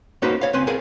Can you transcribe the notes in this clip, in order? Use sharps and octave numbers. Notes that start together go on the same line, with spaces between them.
A#3 C#4 D#4 F#4 B4 C5
C#5 F5
C#2 C4 B4 G#5 C6
G#4 A#4 B4 F5 G#5